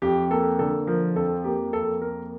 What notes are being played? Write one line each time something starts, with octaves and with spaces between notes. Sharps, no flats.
F2 G4
A#3 A4
D3 A4
F3 A#4
F2 A4
A#3 G4
F2 A4
A#3 A#4